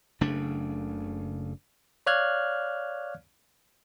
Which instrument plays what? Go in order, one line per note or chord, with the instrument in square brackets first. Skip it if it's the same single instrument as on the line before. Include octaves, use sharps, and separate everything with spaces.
[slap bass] F#1 C#3 A3 D4
[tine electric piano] C#5 D5 F5 F6 F#6 G#6